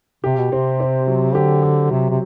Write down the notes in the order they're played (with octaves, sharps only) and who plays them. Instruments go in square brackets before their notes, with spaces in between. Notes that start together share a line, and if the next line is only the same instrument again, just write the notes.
[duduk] C3 [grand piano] G4
[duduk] B2
[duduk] C3 [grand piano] C4
[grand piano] C4
F#3
[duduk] D3 [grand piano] G4
[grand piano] G4
[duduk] C3 [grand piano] F#3
[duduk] C3